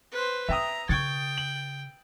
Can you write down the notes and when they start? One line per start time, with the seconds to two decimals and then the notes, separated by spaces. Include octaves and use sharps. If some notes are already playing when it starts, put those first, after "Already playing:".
0.12 B4 C5
0.49 C#4 E5 G5 A#5 D#6
0.89 C#3 G5 C#6 G#6 A6
1.38 F#7